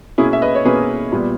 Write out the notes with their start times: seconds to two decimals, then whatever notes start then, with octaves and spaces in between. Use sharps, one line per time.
0.18 B2 A#3 C#4 E4 G#4
0.33 E5
0.42 B4 D#5
0.55 C#5
0.65 B2 A#3 C#4 G#4 B4
1.12 A#2 G3 B3